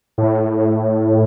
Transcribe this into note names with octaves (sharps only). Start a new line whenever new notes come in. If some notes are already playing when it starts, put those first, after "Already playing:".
A2